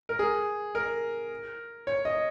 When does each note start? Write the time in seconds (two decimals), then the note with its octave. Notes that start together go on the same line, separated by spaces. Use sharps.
0.09 A#4
0.19 G#4
0.75 A#4
1.87 C#5
2.05 D#5